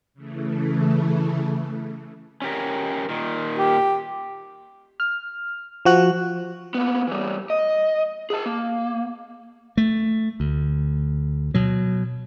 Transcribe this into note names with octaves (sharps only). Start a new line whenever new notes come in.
C#3 E3 A3
C#4 G4 A#4
A#2 D#3
G4
F6
F3 F#4 F#6
A#3 B3
E3 G3
D#5
G#4 A5
A#3
A3
D2
B2 F#3